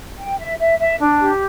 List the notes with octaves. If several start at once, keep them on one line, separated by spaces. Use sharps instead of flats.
G5
E5
E5
E5
D4
G4